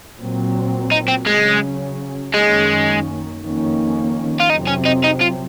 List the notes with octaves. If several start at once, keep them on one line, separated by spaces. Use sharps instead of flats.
A#2 F#3 C4
D#4
C4
C#3 F#3 G#3 C#4
F#2 D#3 G#3 A#3 C#4
F2 D#3 A#3 C#4
F4
F2 C3 F#3 C4 D#4
C#4
D#4
D#4
F4